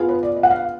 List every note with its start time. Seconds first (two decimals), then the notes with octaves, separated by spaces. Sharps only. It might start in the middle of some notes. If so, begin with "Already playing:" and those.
Already playing: B3 F4 G#4
0.09 B4
0.23 D5
0.36 D#5
0.43 F#5
0.50 F5